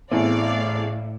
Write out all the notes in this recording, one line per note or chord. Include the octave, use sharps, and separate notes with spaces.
A1 A2 E3 B3 C4 G#4 D5 F5